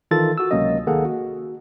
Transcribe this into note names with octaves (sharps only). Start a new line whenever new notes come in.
D#3 E3 F4 A4 A6
F#4 E6
C#2 C3 F#3 A#3 C#4 D#5
D2 D#3 A#3 G#4 A4 F#5
F#4